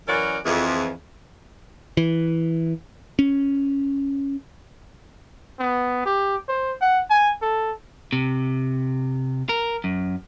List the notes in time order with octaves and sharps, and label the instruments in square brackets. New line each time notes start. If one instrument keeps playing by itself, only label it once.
[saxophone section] F#2 E3 C#4 F#4 A#4 D5
F2 E3 G#4
[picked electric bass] E3
C#4
[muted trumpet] B3
G4
C5
F#5
G#5
A4
[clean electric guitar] C3
A#4
F#2